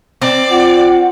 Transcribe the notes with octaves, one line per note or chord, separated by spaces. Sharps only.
C4 D5
F4 F#5